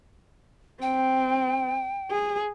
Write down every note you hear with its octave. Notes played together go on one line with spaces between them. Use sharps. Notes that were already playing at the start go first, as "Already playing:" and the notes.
C4 G5
G#4